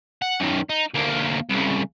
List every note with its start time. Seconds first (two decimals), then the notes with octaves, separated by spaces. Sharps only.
0.22 F#5
0.40 F#2 D#3
0.69 D#4
0.94 D2 A#3
1.50 C2 C#3